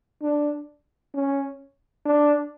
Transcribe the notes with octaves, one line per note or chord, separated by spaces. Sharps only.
D4
C#4
D4